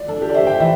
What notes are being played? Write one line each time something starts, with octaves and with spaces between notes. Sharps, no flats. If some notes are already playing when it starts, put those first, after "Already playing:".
Already playing: D5
D4 A4
G4
D5
C5 E5
G5
E3 E5